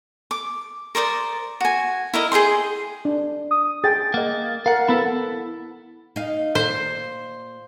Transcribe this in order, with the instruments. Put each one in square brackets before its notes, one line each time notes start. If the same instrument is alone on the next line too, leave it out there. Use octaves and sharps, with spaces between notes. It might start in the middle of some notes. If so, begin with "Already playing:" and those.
[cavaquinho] D6
A#4 C5 D5 D#6
F#4 G#5
E4 A#4 D#5
G#4 D#5 G5 C6
[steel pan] D4
[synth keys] D#6
[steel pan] G#4 G5 [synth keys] A6
[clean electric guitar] A#3 [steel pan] D#5 F#5
[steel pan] A#4 [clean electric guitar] F5 F#5
[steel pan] B3 B5 [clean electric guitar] E4 A4
[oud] D#4 F5
[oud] A#2 [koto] C5